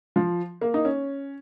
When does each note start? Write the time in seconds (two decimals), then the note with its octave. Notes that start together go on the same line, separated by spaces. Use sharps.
0.16 F3
0.61 A#3
0.74 D#4
0.85 C#4